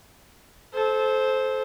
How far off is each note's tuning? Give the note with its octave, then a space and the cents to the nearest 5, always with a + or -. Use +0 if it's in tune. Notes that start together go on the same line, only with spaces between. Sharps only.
A4 -25 C5 +0